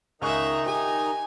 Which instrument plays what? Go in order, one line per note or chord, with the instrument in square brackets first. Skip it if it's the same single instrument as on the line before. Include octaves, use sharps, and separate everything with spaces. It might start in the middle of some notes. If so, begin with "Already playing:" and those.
[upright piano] C#2 C#6 F#6 [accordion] D#3 D#4 A#5 [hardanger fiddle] G#4 E5
[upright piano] G4 [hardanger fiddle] G#5